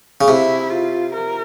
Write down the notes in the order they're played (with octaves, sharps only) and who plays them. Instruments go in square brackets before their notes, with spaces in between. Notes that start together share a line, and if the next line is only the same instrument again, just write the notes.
[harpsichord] C#3
[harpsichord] C3 [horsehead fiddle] E4
[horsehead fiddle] F4
A#4